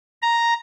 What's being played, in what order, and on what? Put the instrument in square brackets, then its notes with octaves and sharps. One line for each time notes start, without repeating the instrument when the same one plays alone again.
[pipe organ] A#5